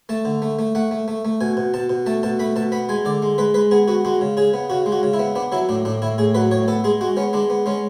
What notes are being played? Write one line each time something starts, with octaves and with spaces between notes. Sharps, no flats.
A3 A5
D3
A3
A3
A3 F#5
A3
A3
A3
B2 G#5
B2
B2 A5
B2
A3 A5
B2 A5
A3 B5
B2 A5
B3 B5
G#3 G#5
D3 D5
G#3
G#3 B4
G#3 B4
B3 G#4
B3 F#4
G#3 F#4
C#3
C#3 G#4
B3
C#3 F#4
G#3
F#4
C#3
E4
B3
B3 D4
F#3 E4
A2 D4
A2 D4
A2 E4
A2 G#4
F#3 B4
A2 C#5
B3 A4
G#3 G#4
G#3 F#4
B3 C#4
G#3 D4
B3
G#3 C#4